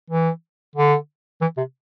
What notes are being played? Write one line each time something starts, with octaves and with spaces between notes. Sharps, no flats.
E3
D3
E3
C3